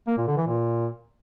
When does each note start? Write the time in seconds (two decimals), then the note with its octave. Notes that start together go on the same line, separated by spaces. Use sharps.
0.07 A#3
0.17 A#2
0.27 D3
0.37 E3
0.47 A#2